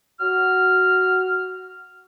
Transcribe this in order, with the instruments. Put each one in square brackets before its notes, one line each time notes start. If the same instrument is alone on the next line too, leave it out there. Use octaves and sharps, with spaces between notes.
[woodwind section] F#4 F6